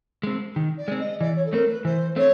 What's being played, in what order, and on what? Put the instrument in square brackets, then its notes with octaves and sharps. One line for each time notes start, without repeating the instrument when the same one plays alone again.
[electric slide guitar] G#3 C4
D#3
[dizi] D5
[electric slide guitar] G#3 C4
[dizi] D#5
[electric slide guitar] E3 [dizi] D5
[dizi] C#5
A4
[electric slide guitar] A3 C4 [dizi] A#4
[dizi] B4
[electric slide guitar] E3 [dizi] C5
[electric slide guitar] A3 C4 [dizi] C#5